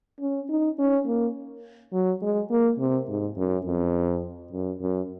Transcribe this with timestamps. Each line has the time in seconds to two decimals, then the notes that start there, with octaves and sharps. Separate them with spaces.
0.21 C#4
0.49 D#4
0.79 C#4
1.07 A#3
1.93 F#3
2.22 G#3
2.51 A#3
2.79 C3
3.08 G#2
3.37 F#2
3.66 F2
4.52 F#2
4.81 F#2